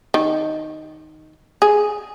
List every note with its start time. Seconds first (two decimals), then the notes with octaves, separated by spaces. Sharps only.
0.14 D#3
1.62 G#4